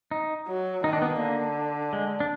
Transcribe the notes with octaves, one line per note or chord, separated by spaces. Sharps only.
D#4
F#3
D#3 D#4
D4
B3
A#3
D3
G#3
D4